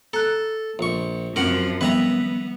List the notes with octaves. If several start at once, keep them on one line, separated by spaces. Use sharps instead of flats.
A4 A#5 F#6
A#1 C#6
F#2 F3 C4 C#4 A#4 F#5
D#3 F3 G3 B3 B4 E5 A#5